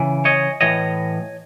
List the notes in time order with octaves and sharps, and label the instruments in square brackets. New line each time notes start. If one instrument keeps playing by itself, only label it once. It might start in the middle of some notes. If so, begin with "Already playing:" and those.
Already playing: [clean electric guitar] C#3 E3
C#5 D#5
A2 E3 C#5 D#5